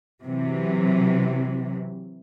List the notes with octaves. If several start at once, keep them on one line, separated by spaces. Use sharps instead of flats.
C3 E3 F#3